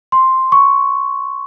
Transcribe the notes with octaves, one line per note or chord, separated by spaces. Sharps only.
C6
C#6